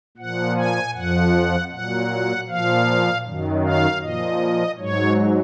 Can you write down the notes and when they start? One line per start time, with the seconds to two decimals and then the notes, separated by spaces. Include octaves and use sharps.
0.17 A#2 F3 F#5
0.57 G#5
0.95 F2 F3 F#5
1.71 A#2 F#3 F#5
2.48 A#2 F3 F5
3.25 F#2 D#3 F#3
3.64 F5
4.02 A#2 F3 D#5
4.78 G#2 F#3 C#5